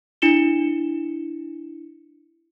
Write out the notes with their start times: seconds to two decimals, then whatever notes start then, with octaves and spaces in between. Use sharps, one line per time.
0.22 D4 E4 C#7 E7 G7